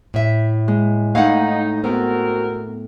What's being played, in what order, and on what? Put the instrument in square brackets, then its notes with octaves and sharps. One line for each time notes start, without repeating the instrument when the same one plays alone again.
[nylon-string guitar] A2 E5
[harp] G#3
[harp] A2 [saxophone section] D#4 [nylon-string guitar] F5 F#5
[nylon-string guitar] B3 [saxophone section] C4 F#4 A#4